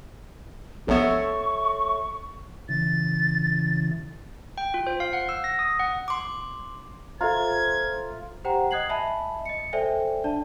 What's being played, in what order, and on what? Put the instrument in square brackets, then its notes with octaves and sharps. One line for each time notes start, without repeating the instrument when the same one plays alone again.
[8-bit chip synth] A#1 B3 [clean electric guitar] A4 C#5 E5 [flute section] C#6
[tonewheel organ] C#3 E3 [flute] A6
[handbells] G5
F4
C5
F5
F#5
E6
A#6
D#6
F#5
[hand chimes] C6 D6
[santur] F4 [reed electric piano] A4 E5 A#5 [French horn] C5 [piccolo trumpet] G#6
[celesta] G4 C5 F#5 G5 A#5
D#5 D#6 F#6 G#6 C7 F#7
D#5 E5 G#5 A5 B5
D#5 C#7
A4 C5 D5 E5 G5 G#5
D4 D5 A5